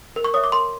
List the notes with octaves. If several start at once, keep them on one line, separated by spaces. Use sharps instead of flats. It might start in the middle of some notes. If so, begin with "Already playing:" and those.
A#4
C#6
C#5 E5 D#6
D6
A#4 C6